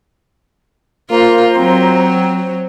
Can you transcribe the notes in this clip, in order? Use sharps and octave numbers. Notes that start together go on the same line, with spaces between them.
A#3 F4 C5 A#5
F#3 C4